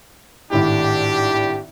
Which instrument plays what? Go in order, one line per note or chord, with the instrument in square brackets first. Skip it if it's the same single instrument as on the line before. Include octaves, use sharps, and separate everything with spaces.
[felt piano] G#1 A2 E4 [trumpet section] D4 G4